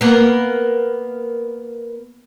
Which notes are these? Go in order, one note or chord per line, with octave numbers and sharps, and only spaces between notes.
A#3 B3